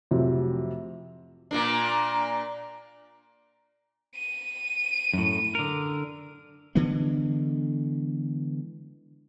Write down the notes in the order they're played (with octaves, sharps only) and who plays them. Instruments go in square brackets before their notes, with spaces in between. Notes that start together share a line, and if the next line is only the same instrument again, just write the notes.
[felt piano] F2 A2 C3 F3 F#3
[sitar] A#2 A#3 D4
[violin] D#7
[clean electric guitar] F#2 A2
D3 A#4
[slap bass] D3 E3 G#3 B3